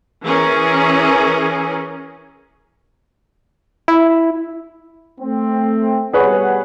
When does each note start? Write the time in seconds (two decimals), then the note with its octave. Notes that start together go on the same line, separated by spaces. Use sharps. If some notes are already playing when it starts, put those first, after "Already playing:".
0.23 E3 C#4 G#4 A#4
3.88 E4
5.21 A3 C4
6.14 B2 G3 G#4 B4 C#5 F#5